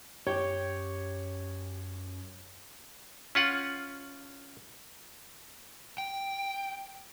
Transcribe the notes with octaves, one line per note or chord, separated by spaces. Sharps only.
F#2 G4 C#5
C#4 F4 F#5
G5